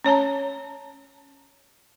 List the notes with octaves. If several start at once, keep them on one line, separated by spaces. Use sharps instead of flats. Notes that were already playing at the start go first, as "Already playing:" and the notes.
C#4 C#5 A5 A#5